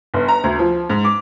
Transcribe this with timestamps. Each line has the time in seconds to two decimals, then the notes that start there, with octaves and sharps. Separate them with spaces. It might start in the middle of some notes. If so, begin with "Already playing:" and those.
0.14 G1
0.28 A#5
0.44 D2
0.59 F3
0.90 G#2
1.04 D6